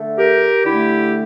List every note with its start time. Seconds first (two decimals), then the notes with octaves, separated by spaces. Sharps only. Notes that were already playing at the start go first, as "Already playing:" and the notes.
Already playing: D3 A3
0.18 G4 A#4
0.64 D3 A3 E4 G4